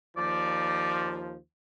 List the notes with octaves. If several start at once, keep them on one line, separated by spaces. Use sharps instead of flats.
D#2 F3 D5